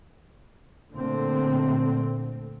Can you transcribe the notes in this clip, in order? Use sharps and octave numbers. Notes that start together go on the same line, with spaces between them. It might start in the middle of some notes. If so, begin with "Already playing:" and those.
A#2 D3 A3 C4